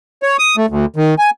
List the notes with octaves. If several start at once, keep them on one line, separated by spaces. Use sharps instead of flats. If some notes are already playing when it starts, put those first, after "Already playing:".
C#5
D#6
A3
D2
D#3
G#5